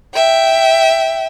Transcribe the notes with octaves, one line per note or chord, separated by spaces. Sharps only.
E5 G5